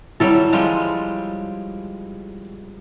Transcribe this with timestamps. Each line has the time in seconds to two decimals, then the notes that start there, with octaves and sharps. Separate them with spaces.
0.20 F#3 G3 E4 A4 C#5
0.53 F3 G3 G#3